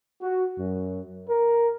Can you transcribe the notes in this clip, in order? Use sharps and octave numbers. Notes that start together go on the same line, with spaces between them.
F#4
F#2
A#4